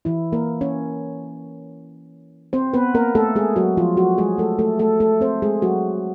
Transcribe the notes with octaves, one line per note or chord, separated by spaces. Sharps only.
E3 E4
A#3 A#4
C#4 C#5
C4 C5
B3 B4
A#3 A#4
A3 A4
G#3 G#4
F#3 F#4
F3 F4
F#3 F#4
G#3 G#4
A3 A4
A3 A4
A3 A4
A3 A4
C4 C5
G#3 G#4
F#3 F#4